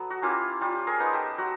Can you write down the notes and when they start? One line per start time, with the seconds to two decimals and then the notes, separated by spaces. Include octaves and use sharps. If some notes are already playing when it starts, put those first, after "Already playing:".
Already playing: F#3 B3 A4
0.10 F#4
0.22 A#3 C#4 E4 F4 G4
0.61 G3 F4 G4
0.87 G#4 A#4
0.99 B3 D#4
1.13 G4 A4
1.38 F#3 F#4